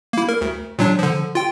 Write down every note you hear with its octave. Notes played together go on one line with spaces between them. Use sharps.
A#3 E4
A#4
D2
A#2 F#3 D4
D3 F3
F4 G5